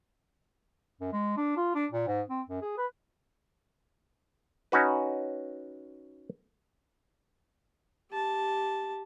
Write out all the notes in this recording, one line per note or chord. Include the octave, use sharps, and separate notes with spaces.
F#2
G#3
D4
F4
D4
A#2
G#2
C4
F#2
G#4
B4
C#4 D#4 F#4 B4
G4 A5